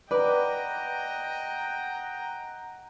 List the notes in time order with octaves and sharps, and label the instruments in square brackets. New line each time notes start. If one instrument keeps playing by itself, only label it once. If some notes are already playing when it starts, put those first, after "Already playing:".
[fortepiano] B4 [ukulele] D5 [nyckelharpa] D#5 G5 [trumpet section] F#5 A#5